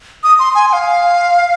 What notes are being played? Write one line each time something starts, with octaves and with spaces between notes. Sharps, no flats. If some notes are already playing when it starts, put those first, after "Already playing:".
D#6
C6
G#5
G#5
F5